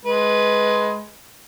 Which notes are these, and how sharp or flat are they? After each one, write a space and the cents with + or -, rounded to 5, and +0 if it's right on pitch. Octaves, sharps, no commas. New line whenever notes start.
G#3 +15 B4 +0